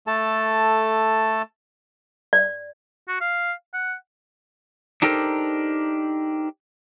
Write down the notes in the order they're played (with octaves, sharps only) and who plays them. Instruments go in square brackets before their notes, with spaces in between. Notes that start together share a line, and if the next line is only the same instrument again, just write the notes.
[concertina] A3 A4 A5
[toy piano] D5
[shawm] F#4
F5
F#5
[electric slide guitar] D4 D#4 G4 A4 A#4 C5